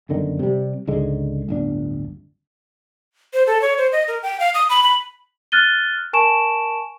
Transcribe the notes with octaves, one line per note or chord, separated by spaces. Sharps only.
G1 F#2 D3 D#3
C3 G3
C#2 G#2 D3 G#3
D1 G1 D4
C5
A4
C#5
C5
D#5
A#4
G5
F5
D#6
B5
B5
F6 F#6 A6 D#7 G7
A#4 G#5 A5 C#6 D7 E7